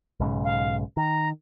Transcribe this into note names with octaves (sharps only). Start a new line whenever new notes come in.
B1 G#2 C#3
F5
D#3 A#5